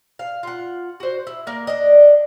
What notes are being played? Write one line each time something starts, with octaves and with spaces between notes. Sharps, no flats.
F5
F4 F#5
F#4 C5
E4
A#3 A#4
D4 D#5